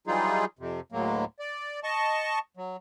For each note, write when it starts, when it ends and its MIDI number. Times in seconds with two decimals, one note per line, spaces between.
0.07 0.45 52
0.07 0.45 54
0.07 0.45 55
0.07 0.45 63
0.07 0.45 65
0.07 0.45 68
0.59 0.80 41
0.59 0.80 48
0.92 1.25 38
0.92 1.25 45
0.92 1.25 54
0.92 1.25 56
0.92 1.25 58
1.39 1.80 74
1.84 2.39 75
1.84 2.39 81
1.84 2.39 85
2.57 2.77 54